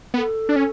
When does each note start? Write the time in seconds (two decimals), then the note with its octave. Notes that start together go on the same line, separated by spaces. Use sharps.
0.14 B3 B4
0.18 A4
0.49 D4
0.56 C#4